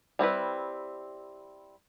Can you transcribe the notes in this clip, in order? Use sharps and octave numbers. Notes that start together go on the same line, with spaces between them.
G3 C4 E4 B4